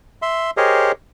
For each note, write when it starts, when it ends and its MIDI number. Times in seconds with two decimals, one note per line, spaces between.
0.22 0.51 76
0.22 0.51 84
0.57 0.92 67
0.57 0.92 68
0.57 0.92 70
0.57 0.92 72
0.57 0.92 73
0.57 0.92 75